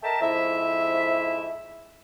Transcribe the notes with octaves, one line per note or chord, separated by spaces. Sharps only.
A4 A#4 D#5 E5 G5 A5
F2 G#2 E4 E5